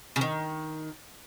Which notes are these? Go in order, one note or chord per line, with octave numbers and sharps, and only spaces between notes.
C#3
D#3